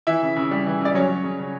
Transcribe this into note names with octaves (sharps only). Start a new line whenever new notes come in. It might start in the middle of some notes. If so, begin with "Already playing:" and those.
E3 E4 E5
C#3
C#3
G3
E3
C#3 D5
F#3 C#4 C#5
F#3
C#3
C#3